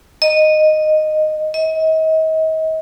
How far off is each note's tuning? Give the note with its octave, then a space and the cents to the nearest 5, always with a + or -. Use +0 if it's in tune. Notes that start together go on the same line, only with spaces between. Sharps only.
D#5 -10
D#5 +35